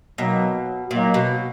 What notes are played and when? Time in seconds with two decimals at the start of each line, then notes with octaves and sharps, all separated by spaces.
0.18 B2 D#3 F#3 A#3
0.91 A#2 D#3 F#3 A#3
1.14 B2